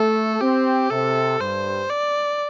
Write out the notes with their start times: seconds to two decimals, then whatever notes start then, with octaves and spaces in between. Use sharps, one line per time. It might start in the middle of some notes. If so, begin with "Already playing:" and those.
Already playing: A3 A4
0.41 C4 G4
0.90 C3 A4
1.39 G2 C5
1.90 D5